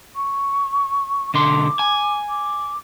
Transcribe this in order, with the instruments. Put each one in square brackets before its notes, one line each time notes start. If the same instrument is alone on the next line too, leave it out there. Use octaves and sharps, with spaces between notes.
[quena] C#6
[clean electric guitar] B1 D3 C6 [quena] D6
[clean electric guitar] G#5
[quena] D6